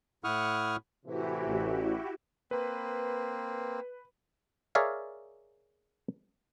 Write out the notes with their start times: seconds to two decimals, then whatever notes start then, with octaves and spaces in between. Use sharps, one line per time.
0.24 A2 E4 F#5 C#6 D#6 F6
1.06 A2 C3 E3 E4 F#4 G4
1.47 A1
2.51 A#3 C4 B4
4.75 G#4 A#4 C#5 D5 E5 F5